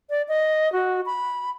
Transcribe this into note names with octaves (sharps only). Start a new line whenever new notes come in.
D5
D#5
F#4
B5